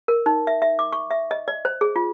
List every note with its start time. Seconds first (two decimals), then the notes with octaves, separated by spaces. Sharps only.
0.08 A#4
0.26 D#4
0.47 E5
0.62 E5
0.79 D6
0.92 C#6
1.11 E5
1.31 D#5
1.48 D5
1.65 C5
1.81 G#4
1.96 F4